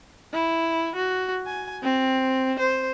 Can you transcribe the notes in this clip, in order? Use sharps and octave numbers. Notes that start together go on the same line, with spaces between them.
E4
F#4
G#5
C4
C5